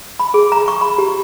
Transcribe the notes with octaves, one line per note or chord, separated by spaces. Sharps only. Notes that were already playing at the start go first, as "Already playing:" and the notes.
B5
G#4
A#5
C#6
B5
G4